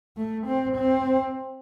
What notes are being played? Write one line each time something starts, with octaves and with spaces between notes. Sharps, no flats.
A3
C4
C4